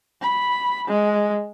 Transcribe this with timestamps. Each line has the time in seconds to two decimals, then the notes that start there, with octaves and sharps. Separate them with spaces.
0.22 B5
0.88 G#3